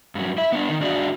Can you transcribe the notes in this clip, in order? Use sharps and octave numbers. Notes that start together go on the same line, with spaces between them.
G2 F#3
E4 E5
B3 D4
D#3
G2 D4 F#4 G#4 D5